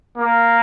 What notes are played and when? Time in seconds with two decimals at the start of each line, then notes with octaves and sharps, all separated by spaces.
0.18 A#3